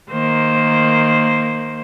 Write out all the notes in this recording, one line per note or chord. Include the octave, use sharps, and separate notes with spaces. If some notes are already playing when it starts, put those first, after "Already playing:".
D#3 A#3 C5